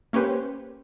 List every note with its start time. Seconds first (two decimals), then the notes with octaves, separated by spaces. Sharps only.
0.13 A#3 C#4 G4 B4 C5